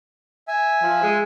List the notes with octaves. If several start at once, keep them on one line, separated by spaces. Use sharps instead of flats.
E5 G#5
F3
G#3